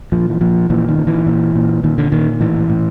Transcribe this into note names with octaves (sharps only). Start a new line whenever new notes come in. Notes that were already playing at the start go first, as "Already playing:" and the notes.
A#2 F3
E3
A#2 F3
A#2 E3
D#3
A#2
E3
A#2
A#2
A#2 D#3
D3
A#2 D#3
A2 E3
A2